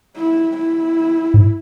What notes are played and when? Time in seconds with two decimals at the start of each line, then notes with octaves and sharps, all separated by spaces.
0.16 E4
0.57 E4
1.34 G#2